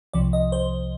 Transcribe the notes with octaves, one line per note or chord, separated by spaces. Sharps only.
C2 C3 F3 D5
D#5
C5